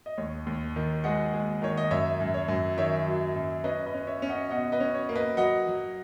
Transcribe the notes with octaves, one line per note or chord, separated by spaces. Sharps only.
D#5
D#2 C#5
D#2
D#3
G#3 D#5 F#5
G#3
D#3 C#5
D#5
F#2 C#5 E5
F#2
C#5
F#2
D#3 C#5 E5
F#3
F#2
C#4 B4 D#5
B4 D#5
C#4
C#5 E5
C#4
D#5 F#5
B2 D#5 F#5
B4 D#5
C#4
C#5
A#3
B4 D#5
F#3 D#5 F#5
F#3